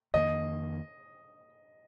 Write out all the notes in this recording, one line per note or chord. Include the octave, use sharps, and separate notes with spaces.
F2 D#3 A#3 D#5